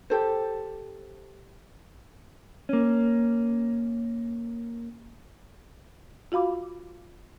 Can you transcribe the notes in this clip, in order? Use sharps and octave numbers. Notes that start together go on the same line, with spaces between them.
G4 A4 C5
A#3 C#4
F4 F#4 F5 B5 D6